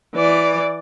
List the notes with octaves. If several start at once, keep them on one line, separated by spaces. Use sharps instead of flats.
E3 D5